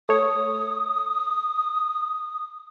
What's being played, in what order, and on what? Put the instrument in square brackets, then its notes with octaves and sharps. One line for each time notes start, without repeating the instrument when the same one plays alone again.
[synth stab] A3 C#5 [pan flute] D#6